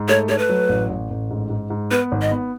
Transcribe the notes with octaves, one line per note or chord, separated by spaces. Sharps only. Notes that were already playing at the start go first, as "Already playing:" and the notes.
Already playing: G#2
A3 C#5
A3 C#5
B4
F#3
A1
A1
A1
G#2
G#2
G#2
B3 B4
G#1
D#5
B3